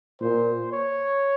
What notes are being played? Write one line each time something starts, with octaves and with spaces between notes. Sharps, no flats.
A#2 C5
C#5